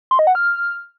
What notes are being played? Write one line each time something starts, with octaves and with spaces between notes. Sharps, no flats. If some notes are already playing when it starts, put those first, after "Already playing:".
C6
D#5
F#5
F6